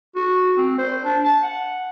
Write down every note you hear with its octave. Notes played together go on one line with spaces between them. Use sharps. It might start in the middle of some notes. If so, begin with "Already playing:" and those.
F#4
C4
C5
D4
A5
F#5